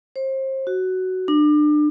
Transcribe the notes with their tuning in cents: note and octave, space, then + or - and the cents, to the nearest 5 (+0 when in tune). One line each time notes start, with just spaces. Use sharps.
C5 +30
F#4 +10
D4 +30